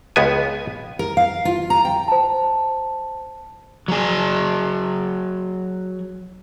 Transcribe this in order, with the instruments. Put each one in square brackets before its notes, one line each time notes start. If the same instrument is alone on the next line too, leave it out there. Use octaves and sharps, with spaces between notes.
[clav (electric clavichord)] C#2 B3 G#5
[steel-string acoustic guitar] A#4
F5
F4
A#5
G5
[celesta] C5 A5
[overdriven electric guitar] F#3 G#4